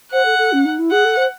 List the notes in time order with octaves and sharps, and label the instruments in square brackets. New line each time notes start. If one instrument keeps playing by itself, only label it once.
[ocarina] C5 [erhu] F#5
[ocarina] A4
A4
C#4
D#4
E4
[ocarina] G#4 [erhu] F#5
[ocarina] A4
C5